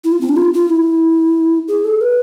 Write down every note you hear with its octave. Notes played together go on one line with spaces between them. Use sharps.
E4
F4
C4
D4
F4
F4
E4
G#4
A4
B4